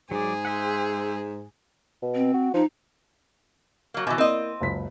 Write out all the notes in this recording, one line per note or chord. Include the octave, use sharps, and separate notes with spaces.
G#2 F#3 G#4 D5
C5 E5 F#5
B2
C4
F#4
F3 D#4
F#3 A#3
B2 E3 G#5 D6
A#3 C4 E4 D5 D#5
F#1 C#2 B6